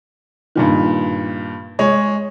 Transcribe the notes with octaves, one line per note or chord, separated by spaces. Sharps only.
G2 A#2 D#3
G#3 C#5